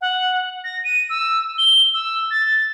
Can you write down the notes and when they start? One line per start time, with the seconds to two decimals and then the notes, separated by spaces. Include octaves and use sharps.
0.01 F#5
0.64 A#6
0.84 D#7
1.10 E6
1.58 G7
1.94 E6
2.31 A6